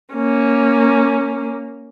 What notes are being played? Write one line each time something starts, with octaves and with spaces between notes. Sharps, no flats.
A#3 C#4